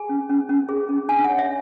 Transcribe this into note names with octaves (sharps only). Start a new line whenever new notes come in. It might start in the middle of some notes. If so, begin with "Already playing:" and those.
Already playing: G#4 G#5
C#4
C#4
C#4
G#4
C#4
D4 G#5
F#5
C#5
E5